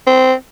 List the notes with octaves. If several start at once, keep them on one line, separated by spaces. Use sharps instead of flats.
C4